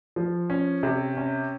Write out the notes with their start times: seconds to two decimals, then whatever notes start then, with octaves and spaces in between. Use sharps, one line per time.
0.16 F3
0.50 C#4
0.83 C3
1.17 C#4